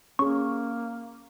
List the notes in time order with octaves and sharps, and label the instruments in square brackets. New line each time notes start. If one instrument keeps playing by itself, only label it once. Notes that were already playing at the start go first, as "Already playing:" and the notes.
[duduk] A#3 [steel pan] C#4 G#4 [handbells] C#6